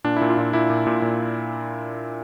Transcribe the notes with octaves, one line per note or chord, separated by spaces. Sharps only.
A#2 D4
E4
A#2
F4
A#2 E4
A#2 E4
A#2
A#2
A#2